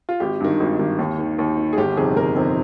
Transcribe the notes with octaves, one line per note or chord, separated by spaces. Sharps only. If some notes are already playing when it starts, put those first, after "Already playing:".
F4
G#1 G4
G2 D#3
G#1
G2 D#3
D#2
D#3
D#2
D#3
G#4
G1 G4
F2 C3 D#3 G#4
G1 A#4
F2 C3 D#3